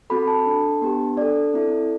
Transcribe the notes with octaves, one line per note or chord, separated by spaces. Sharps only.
C4 F#4 A4 B5
A5
D4 A4
B3 D4 G4
D4 A4 D5
C4 E4 A4